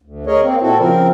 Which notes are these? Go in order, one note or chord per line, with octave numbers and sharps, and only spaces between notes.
D2
G#4 A#4 C#5 D#5
A#3 C4
A#2 C4 E4 F#4 A4
C#3 F3 C4 A#4